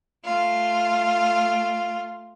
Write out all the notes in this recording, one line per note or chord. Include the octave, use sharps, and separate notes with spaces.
A3 F4